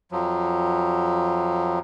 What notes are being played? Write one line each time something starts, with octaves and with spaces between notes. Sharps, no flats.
F2 F3 F#3